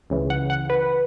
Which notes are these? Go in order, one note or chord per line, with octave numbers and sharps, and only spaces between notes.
C#2 C#3 E3
F#5
F#5
B4